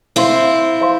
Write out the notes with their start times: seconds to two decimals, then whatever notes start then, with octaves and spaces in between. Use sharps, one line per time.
0.16 C4 E4 C5 F5 C6
0.81 C5 F5 C6